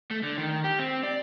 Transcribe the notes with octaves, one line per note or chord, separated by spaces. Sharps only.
A3
D3
D#3
G4
C4
D5